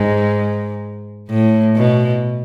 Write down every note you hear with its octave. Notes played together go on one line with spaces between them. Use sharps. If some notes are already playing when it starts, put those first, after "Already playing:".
Already playing: G#2
A2
B2